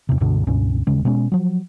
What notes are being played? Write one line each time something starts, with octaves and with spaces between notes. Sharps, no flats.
E2 C3
C#2 G2 B2 D3
C#2 G2 B2 C#4
D#1 C#3 G#3
B2 G#3 C#4
F3 F#3